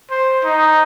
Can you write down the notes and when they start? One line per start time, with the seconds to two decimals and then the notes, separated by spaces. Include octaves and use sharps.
0.11 C5
0.44 D#4